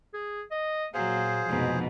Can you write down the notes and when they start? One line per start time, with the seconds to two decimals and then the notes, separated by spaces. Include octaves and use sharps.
0.14 G#4
0.51 D#5
0.94 A#2 F#3 G#4 C5 F5
1.48 F1 G#2 B2 F3